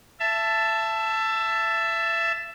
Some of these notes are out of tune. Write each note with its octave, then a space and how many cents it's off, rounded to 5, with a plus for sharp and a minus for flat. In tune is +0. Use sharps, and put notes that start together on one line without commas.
E5 +20 A5 +0